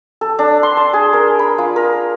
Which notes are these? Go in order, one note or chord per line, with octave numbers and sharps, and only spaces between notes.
A4
D4
C6
A5
G#4
A#4
B5
F4
A#4